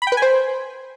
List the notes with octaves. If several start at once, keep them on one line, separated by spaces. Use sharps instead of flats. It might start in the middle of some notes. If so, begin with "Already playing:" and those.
B5
G5
B4
G#5
C5